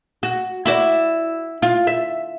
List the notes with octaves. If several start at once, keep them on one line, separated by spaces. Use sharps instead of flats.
F#4
E4 F#4 D5
F4
E5